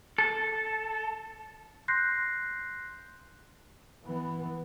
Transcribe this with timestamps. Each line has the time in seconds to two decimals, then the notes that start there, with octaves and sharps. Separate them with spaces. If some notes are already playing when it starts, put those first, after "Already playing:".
0.18 A4
1.88 C6 F#6 G6 A#6 C7
4.05 E3 B3